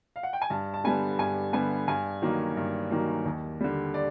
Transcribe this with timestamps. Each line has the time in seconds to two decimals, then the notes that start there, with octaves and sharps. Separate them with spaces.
0.16 F5
0.23 F#5
0.33 G5
0.42 G#5
0.50 G2 A5
0.74 A5
0.84 D3 G3 B3 G#5
1.19 G2 G#5
1.53 D3 G3 B3 G#5
1.88 G2 G#5
2.22 D#3 F#3 A#3
2.57 G2
2.91 D#3 F#3 A#3
3.25 D#2
3.60 D3 G3
3.94 D5